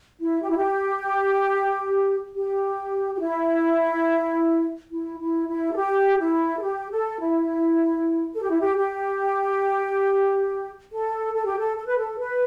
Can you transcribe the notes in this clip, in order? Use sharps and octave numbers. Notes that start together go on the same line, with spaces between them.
E4
G4
E4
G4
G4
G4
E4
E4
E4
E4
A4
G4
E4
A4
G4
A4
E4
A4
G4
E4
G4
G4
A4
A4
G4
A4
A4
B4
A4
B4